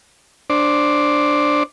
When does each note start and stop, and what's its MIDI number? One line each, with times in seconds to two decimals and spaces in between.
0.50 1.63 62
0.50 1.63 72
0.50 1.63 74